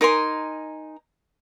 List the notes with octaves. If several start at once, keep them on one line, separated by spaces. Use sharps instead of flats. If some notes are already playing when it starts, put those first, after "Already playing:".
D#4 A#4 G#5 C6